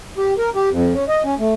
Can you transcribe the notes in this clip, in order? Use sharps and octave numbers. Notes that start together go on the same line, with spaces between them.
G4
A#4
G4
F2
C#4
D#5
C#4
A3